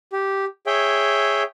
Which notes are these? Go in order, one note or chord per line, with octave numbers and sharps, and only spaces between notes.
G4
G#4 C#5 E5 G5